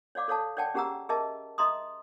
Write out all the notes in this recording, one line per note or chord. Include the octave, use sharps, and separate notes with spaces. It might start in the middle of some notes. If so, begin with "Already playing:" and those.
C#5 D5 F5 D6
A4 C#5 F5 A5
C#5 D5 F#5 G5 A5
C#4 G4 G#4 F#5 A#5 E6
G#4 A#4 D#5 E5 A5
D#5 E5 A#5 C6 D#6